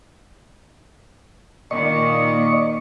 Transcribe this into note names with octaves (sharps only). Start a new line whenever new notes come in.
A#2 D#3 A#3 D5 D#5 C#6